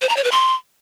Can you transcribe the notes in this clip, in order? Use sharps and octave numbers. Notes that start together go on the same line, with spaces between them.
C5
A#5
C#5
B4
C6